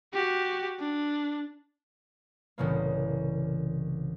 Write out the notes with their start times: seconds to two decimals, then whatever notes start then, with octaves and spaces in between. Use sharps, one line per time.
0.13 F#4 G4
0.79 D4
2.58 C2 A2 C#3 E3 A#3